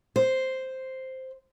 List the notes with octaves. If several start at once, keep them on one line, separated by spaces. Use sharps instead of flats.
C5